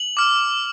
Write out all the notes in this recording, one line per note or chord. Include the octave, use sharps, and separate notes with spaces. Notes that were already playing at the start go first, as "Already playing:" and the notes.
Already playing: F#7
D6 F6